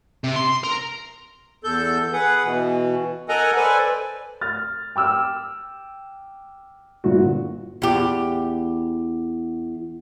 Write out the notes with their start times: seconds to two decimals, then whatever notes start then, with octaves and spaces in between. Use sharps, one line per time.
0.24 C3
0.36 C6
0.64 A#4
1.64 E2 A4 G6
2.13 G#4 B4 F#5
2.45 B2 E3
3.29 A4 A#4 D#5 F#5 G#5 A#5
3.57 A4 B4 C5 D5 G#5
4.41 F6 A6
4.96 G5 D6 E6 F6
7.04 G1 A#2 D3 F#4
7.82 E2 G4